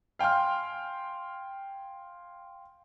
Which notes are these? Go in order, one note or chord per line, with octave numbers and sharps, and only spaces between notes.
F5 G5 G#5 C6 F6